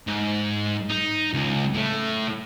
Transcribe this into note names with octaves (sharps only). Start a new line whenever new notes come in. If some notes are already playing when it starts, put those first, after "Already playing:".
G#2
D#4
C#2
A2 A3